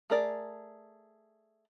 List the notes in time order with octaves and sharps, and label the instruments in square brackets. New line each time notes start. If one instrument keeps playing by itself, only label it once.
[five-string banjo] A3 G#4 A#4 D5